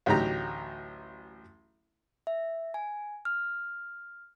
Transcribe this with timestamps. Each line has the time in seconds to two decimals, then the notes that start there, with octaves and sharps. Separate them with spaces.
0.06 A1 D2 F#3 D#4 G4 A#5
2.27 E5
2.74 G#5
3.25 F6